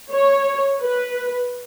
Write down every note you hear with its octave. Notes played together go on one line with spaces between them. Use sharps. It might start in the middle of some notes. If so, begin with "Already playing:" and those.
C#5
B4